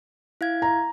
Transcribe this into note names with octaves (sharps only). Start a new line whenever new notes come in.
E4 F5 G#6
A#5